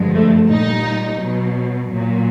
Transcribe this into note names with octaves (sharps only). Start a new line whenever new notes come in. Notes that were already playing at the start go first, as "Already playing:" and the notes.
Already playing: G2 D3 F3 G#3
A3
A#2 G3 D#4
B2 F#3
A#2 F#3